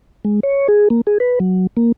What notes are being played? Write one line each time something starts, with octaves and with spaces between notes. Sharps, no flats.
G#3
C#5
G#4
A#3
G#4
B4
F#3
A#3